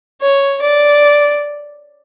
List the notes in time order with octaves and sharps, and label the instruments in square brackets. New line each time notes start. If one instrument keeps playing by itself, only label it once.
[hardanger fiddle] C#5
D5